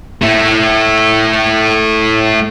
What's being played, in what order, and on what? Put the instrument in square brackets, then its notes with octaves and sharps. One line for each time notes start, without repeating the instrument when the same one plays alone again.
[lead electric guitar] A3 E4